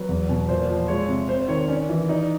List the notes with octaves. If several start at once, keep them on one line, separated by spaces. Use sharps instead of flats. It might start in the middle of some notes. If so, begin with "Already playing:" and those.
Already playing: F#3 B4
E2
B2
A#2 C5
F3
G#3 C#5
C3
C4 C5
C5
D#3 C#5
C#5
C#4 D5
E3
D#4 D5